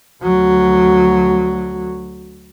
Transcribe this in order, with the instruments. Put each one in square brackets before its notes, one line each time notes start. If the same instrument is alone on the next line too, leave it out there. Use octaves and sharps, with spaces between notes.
[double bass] D2 F#3